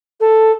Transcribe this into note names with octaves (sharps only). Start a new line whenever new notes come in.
A4